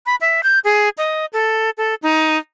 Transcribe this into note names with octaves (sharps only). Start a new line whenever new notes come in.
B5
E5
G6
G#4
D#5
A4
A4
D#4